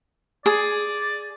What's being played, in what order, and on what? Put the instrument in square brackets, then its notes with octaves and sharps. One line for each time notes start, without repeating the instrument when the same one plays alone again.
[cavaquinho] G#4 [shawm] D5